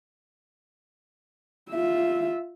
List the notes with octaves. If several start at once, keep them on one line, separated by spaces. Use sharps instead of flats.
F4 E5